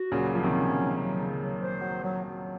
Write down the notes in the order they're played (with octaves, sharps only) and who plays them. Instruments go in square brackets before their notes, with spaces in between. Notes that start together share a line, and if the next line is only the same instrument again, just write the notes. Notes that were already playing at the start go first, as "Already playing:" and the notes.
Already playing: [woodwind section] F#4
[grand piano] A#2 C#3 [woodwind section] F#3
[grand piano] F3 [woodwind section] F#3
[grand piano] C3 D#3
[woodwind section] C#4
F#3
F#3
C#3
F#3
C5
F#3
F#3
F#3